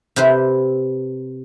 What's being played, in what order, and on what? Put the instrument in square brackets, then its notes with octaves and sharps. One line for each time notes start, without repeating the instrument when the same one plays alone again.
[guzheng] C3 G4 B4 C5